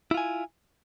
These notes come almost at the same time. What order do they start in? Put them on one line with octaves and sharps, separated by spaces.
E4 F4 G#5